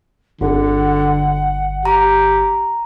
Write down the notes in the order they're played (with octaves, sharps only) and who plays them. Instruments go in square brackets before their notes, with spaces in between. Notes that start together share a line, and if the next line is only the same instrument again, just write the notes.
[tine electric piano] G1 [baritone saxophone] D3 [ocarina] F#5
[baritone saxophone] G4 [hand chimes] A#5